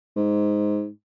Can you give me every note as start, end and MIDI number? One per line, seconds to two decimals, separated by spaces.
0.16 0.88 44